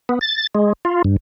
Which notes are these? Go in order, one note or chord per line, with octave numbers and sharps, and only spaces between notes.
B3
A6
G#3
F4
G2